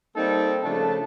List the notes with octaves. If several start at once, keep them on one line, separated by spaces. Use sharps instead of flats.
G3 A#3 C4 D#4 A4
C#3 F3 A3 D4 A5